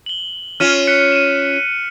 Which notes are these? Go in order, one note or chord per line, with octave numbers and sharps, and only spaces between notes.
F#7 G7
C#4 F4 F6 D#7 E7
F#6 B6 C#7
D#7 E7